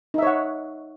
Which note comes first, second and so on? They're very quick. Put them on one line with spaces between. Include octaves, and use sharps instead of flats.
D#4 E5 C#5 F#5